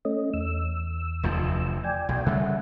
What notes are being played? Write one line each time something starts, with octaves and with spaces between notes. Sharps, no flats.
A3 C#4 D#5
E2 E6
F1 D2 F3
D5 G5 G#5
B1
C#3 G3 A3 E5 F#5